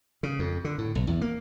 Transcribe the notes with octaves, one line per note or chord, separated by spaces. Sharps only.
C#3
F2
D3
A2
B1
E2
A#3